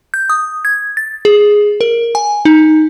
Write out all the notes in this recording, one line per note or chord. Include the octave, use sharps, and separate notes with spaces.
G6
D#6
G#6
A6
G#4
A#4
G#5
D#4